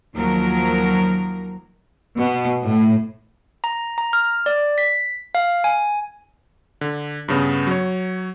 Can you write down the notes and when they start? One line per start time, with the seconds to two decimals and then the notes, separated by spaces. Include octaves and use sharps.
0.15 D#2 F3 F#3 A#4
2.16 B2
2.63 A2
3.64 A#5
3.98 A#5
4.13 F6
4.46 D5
4.78 B6
5.35 F5
5.64 G#5
6.81 D3
7.28 G2 C#3 B3
7.67 F#3 C#5